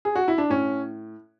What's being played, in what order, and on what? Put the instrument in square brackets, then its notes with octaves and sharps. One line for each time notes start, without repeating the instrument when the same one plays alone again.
[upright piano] G#4
F#4
E4
D4
A2 C#4